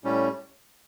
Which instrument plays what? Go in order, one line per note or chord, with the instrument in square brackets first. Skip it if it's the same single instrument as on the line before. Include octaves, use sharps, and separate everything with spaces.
[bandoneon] A2 G3 C#4